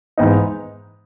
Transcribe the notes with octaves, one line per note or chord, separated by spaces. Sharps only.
G#2 E3 B3 D#4